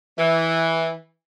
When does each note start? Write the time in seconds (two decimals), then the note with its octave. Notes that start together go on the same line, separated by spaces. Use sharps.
0.18 E3